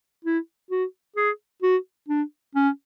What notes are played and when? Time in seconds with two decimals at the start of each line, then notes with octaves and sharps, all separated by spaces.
0.25 E4
0.71 F#4
1.16 G#4
1.63 F#4
2.09 D4
2.55 C#4